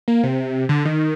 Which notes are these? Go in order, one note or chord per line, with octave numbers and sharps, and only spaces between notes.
A#3
C3
D3
D#3